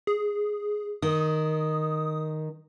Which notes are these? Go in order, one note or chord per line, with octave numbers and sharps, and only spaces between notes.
G#4
D#3 D#6